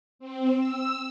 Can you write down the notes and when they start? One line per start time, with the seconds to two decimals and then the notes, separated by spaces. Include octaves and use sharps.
0.19 C4
0.56 E6